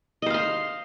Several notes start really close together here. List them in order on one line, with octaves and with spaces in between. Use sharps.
D#5 C5 F5 C6